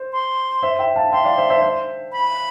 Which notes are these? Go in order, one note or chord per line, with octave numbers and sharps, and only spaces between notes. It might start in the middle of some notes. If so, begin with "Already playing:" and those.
Already playing: C5
C6
C5 E5
E5 G5
F5 A5
E5 G5 C6
D5 F5
C5 E5
C5 E5
C5 E5
B5